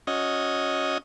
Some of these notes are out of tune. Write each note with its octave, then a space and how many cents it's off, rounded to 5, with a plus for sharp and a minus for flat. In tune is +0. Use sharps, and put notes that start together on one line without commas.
C#4 +0 F#4 -25 D#5 +5